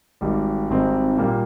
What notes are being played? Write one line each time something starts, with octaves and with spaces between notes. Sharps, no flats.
G#1 G#2 G3
G#1 G#2 G3 C4 D#4
A#2 G3 A#3